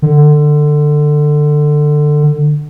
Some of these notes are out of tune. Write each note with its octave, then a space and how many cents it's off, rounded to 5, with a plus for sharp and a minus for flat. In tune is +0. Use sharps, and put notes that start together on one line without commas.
D3 +20